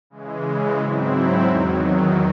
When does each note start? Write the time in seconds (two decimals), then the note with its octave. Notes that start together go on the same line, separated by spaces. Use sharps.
0.10 C#3 E3 G#3
0.77 G#2 F#3 C4 E4
1.44 E2 D#3 F#3